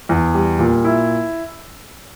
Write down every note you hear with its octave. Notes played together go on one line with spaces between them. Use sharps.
E2
G3
A#2
E4